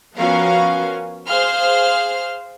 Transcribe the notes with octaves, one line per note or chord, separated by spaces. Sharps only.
F3 B3 C#4 F#4 A#4 F5
G#4 C5 F5 C6 F6